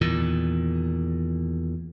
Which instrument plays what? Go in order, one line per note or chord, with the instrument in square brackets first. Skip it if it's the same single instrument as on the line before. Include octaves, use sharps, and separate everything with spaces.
[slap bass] E2 A#2 D#3